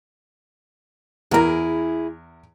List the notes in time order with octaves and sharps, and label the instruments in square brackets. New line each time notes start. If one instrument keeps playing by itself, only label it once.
[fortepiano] E2 A#4 A#5 [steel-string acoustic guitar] E4 G#4